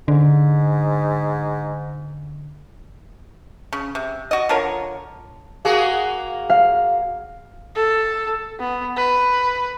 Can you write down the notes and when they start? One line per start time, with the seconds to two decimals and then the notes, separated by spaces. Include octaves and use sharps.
0.08 G#2 D3
3.73 C#3
3.95 C3
4.31 F#4 D#5
4.49 D3 F4 A#4 C#5
5.65 A#3 F#4 G#4
6.50 F5
7.75 A4
8.59 B3
8.96 B4